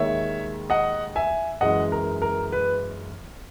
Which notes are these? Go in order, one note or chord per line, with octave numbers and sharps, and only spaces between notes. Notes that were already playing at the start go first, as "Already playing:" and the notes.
Already playing: D#2 D#3 G#3 C#5 E5
D#5 F#5
E5 G#5
F#2 E3 G#3 D#5 F#5
A#4
A#4
B4